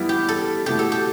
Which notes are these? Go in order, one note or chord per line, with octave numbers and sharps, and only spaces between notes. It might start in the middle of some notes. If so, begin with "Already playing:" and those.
Already playing: E3 G3 B3 E4
G4
A4
B2 A3 E4 G4
A4
G4